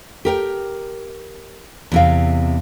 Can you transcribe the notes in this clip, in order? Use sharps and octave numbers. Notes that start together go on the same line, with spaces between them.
G4 A#4 G5
E2 C3 F5